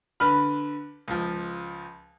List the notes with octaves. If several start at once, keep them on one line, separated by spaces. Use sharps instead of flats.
D3 B4 B5 F6
C#2 F3